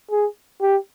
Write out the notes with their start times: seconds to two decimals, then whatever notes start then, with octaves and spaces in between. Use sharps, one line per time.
0.11 G#4
0.61 G4